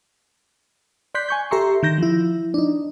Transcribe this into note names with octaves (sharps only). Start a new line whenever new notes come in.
D5 C6 F#6 G6 B6
G#5 C#6 G6
G4 A4 E5 A#5 C6 C#6
D#3 G6 A#6
F3 E4
D4 D#4